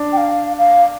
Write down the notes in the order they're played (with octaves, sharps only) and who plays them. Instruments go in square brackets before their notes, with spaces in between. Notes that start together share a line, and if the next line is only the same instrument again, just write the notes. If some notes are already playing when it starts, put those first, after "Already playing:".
Already playing: [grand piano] D4
[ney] G5
F5
F5